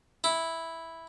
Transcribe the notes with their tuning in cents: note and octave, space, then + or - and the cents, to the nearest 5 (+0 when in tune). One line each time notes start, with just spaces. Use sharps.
E4 -5